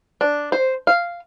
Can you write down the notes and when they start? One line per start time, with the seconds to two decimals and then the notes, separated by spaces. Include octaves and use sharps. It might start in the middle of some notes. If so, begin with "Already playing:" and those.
0.21 D4
0.52 C5
0.87 F5